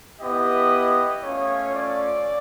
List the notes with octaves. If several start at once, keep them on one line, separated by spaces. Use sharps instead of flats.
B3 E4 G4 D#5
A3 C#4 F4 C#5
D5